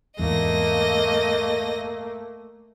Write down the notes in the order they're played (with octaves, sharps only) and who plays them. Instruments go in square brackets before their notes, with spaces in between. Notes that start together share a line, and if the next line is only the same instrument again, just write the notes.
[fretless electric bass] E2 G#2 [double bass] A3 A#3 [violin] D#5 A#6